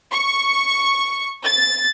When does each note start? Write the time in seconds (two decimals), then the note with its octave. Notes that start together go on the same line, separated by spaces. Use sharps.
0.11 C#6
1.43 A6